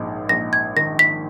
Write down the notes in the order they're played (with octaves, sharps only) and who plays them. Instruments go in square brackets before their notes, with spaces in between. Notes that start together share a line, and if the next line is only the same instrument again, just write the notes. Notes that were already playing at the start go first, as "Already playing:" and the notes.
Already playing: [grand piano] A#1 G#2
[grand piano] A#1 [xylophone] A#6
[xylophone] G#6
[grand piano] D#3 [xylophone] A#6
[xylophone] B6